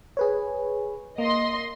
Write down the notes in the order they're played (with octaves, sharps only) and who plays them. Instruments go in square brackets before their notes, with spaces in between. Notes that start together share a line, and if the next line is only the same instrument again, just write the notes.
[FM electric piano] G#4 B4 C#5
[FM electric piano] A#3 [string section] D#5 C6